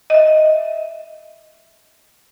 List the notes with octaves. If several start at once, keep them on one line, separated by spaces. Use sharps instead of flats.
D#5 E5